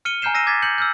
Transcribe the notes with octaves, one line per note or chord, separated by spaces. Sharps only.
F6 C#7 D#7 G7
G#5 A#5 F6 G6 C7 E7
E6 A#6 C7 D#7 E7
D6 G#6 A6 B6
G6 C#7 F#7
E6 F6 G6